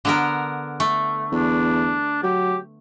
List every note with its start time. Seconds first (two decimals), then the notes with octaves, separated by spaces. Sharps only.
0.05 D3 B3 A#4
0.80 A3
1.32 E2 D4
2.23 F#3 G4